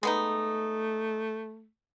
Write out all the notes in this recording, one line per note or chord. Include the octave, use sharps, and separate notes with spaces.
G#3 A3 B3 D#4